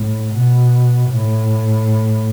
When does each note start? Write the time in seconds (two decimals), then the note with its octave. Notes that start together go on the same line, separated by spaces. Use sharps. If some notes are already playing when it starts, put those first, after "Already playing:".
Already playing: A2
0.33 B2
1.11 A2